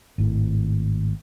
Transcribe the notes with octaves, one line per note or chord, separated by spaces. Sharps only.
G#1 A2